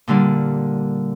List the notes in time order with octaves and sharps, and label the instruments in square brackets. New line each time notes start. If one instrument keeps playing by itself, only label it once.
[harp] A#2 D3 G3 A#3